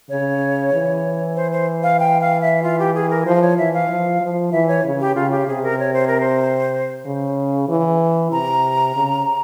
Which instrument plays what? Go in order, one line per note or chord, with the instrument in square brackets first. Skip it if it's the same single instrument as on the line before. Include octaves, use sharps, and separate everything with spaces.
[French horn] C#3 [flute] C#5
[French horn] E3
[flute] C5
C5
F5
G5
F5
E5
F4
G4
G#4
A#4
[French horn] F3 [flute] C5
[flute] C#5
[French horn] E3 [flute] E5
[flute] F5
[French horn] F3
F3
[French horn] E3 [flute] E5
[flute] C#5
[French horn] C#3
[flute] G4
[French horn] C#3 [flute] F4
[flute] G4
[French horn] C3 [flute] G#4
[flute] A#4
C#5
C5
A#4
C5
[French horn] C#3
E3
[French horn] C3 [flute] A#5
[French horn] C#3